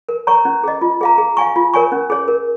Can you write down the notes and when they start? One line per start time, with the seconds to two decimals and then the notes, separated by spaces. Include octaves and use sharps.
0.09 A#4
0.27 C#5 A#5 C#6
0.45 C#4
0.64 G#4 D#5
0.81 F4
1.01 G#4 F5 A#5
1.18 G#4
1.37 F5 G#5 C#6
1.56 F4
1.74 A#4 C#5 G#5 C#6
1.92 C#4
2.10 G#4 C#5
2.28 A#4